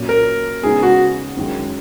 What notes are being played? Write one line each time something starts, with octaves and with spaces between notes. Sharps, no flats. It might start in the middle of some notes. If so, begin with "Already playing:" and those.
Already playing: A#2 F#3 C#4
A#4
C#3 G#3 B3 D#4 G#4
F#4
F#2 D#3 G#3